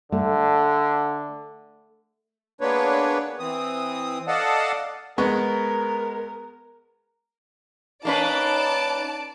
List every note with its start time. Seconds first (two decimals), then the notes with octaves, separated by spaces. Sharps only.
0.12 D3 A3
2.61 G#3 A#3 B3 D4 B4 C#5
3.39 E3 C4 D#6
4.28 A4 D5 D#5 F5 F#5 A5
5.18 G#3 B3 A#4 C#6
8.05 A#3 C#4 D#4 B4 D5 A5 D7